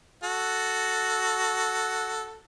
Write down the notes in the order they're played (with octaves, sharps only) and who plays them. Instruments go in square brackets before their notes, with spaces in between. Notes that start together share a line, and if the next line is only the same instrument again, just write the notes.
[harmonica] F#4 A4